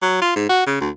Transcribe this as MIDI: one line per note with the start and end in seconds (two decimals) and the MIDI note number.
0.02 0.19 54
0.21 0.34 65
0.36 0.45 44
0.49 0.61 66
0.66 0.79 49
0.81 0.90 38